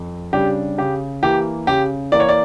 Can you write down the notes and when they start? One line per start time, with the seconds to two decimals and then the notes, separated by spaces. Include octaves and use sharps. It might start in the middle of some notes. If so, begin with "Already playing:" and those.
Already playing: F2
0.33 C#3 G3 D4 G4
0.78 C#3 G4
1.23 E3 A#3 G4
1.67 C#3 G4
2.12 E3 A#3 D5
2.20 C#5
2.29 D5